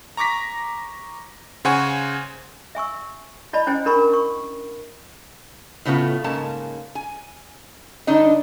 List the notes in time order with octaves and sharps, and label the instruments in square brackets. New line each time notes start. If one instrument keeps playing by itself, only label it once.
[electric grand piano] A#5 C#6 D6 A#6 B6
C#3 C5 F#5 G#5 C#6
[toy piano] E5 G#5 C#6 E6
E4 D5 D#5 A5 B5
C#4 E4 C5 G5 G#5
D4 E4 A#4 A5 B5 C#6
A#4
C#6
[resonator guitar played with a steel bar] A2 C#3 A3 B3 F4
G#2 C#3 A#3 A5
G#5
G2 D3 D4 D#4 D#5